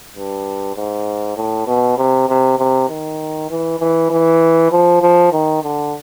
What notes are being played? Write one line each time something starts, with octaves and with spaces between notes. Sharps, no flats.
G2
G#2
A2
B2
C3
C3
C3
D#3
E3
E3
E3
F3
F3
D#3
D3